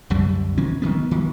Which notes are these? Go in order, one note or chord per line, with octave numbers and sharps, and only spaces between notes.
C2 F#2 D3 G3
D#3 C4 C#4
D2 D#3 G3 B3
D#3